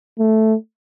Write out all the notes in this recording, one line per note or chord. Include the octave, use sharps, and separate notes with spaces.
A3